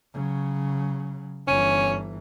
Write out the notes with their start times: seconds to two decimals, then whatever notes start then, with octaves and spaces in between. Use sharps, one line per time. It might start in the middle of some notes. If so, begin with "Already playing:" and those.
0.13 C#3 F#3
1.47 G1 E3 C#4